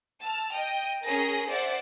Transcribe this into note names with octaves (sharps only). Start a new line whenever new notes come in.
A5 E6 F6
D#5 G5
C#4 G#4 A#4 A#6
C5 D5 E5 F#5